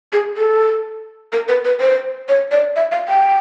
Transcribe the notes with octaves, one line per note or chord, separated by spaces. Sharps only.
G#4
A4
A#4
B4
B4
C5
C#5
D5
E5
F5
G5